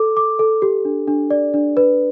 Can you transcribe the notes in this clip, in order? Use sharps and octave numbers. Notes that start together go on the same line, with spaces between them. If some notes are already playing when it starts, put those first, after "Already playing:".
Already playing: A4 D6
D6
A4
G4
D4
D4
D5
D4
B4